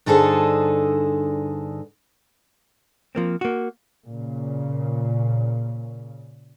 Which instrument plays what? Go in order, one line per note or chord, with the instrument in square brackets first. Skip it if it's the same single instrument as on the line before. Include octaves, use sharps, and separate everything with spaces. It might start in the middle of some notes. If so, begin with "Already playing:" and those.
[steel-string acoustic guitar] G2 D3 D#4 G#4 A4 C5
[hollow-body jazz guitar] F3 A#3 C4
A#3 F#4
[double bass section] A#2 C#3